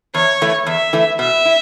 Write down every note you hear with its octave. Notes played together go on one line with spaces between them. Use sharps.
E2 C#5
E3 A3
E2 E5
E3 A3
B2 E5
E4